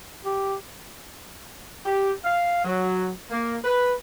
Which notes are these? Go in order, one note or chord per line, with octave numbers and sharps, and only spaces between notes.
G4
G4
F5
F#3
A#3
B4